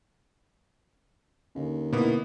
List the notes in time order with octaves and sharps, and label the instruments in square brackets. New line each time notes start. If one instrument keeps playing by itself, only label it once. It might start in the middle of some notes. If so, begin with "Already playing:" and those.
[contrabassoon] D#2 [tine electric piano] D3 C#4
[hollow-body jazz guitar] B2 E4 [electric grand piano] A#3 B3